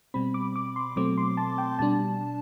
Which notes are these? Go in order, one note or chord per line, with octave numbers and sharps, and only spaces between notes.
B2 G3 C4 B5
D6
D6
C6
B2 F#3 A3 C4 D6
C6
A5
G5
B2 G3 D4 A5